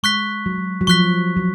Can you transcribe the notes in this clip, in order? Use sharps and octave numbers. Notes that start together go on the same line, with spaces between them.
G#3 C#6 F#6 B6
F#3
F#3
F3 C#6 F#6 B6
F#3